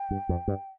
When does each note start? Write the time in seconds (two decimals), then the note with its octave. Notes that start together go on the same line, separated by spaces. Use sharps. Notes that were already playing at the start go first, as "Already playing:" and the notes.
Already playing: G5
0.11 G2
0.29 F2
0.48 G2